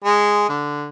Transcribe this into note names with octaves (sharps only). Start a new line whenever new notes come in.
G#3
D3